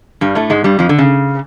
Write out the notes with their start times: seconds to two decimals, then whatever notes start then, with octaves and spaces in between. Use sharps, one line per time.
0.21 G2 G3
0.35 A2 A3
0.50 G#2 G#3
0.64 G2 G3
0.79 F2 F3
0.89 D3
0.98 C#3